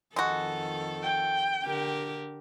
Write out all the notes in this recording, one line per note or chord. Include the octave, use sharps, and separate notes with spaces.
F2 D#3 G#3 F#4 A4
G5
D3 G4 A#4